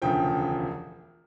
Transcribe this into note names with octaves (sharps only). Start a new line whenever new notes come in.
E1 D2 C#3 F3 G5